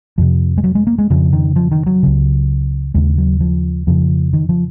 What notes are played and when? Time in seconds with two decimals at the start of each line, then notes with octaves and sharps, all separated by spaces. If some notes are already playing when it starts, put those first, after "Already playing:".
0.18 F2 C3 F3
0.58 G#3
0.64 F#3
0.75 G#3
0.87 A#3
0.98 G#3
1.10 F2 C#3 F3
1.33 D#3
1.56 F3
1.72 D#3
1.87 F#3
2.03 C#2 C#3
2.94 D#2 C#3 G#3
3.18 F#3
3.40 F3
3.87 F2 C#3 F3
4.33 D#3
4.49 F3